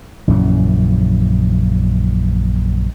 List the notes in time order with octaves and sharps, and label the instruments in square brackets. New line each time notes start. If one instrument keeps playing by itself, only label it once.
[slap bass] A#1 F#2 C#3 E3